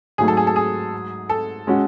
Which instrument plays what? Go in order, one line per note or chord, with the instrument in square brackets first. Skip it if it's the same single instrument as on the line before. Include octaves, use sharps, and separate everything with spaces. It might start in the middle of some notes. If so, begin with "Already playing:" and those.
[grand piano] G#2 F#3 A3 [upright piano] G#4
[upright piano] A4
G#4
A4
G#4
A4
[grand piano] G#3 C#4 F#4